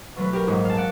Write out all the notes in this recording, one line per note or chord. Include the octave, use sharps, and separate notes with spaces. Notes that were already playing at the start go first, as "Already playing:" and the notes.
B2 F#3 A3 B4
G4 A#4
A#1 G#2 G#3
F5 A5
D5 F#5